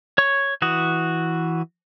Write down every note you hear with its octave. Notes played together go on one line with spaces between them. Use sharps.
C#5 C#6
E3 F#4 D#6